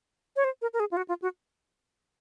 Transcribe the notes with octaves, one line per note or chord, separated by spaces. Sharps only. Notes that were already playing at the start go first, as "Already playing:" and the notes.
C#5
C5
A#4
A#4
G#4
F4
F#4
F4
F#4